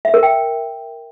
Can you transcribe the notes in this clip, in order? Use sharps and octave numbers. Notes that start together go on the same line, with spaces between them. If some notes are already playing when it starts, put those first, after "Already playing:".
E5
A#4
G5